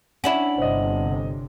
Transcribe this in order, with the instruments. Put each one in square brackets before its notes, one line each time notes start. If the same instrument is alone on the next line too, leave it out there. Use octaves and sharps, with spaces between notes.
[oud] C#4 D4 E4 [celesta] F#5 F#7
[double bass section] G1 C3 [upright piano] C5 D#5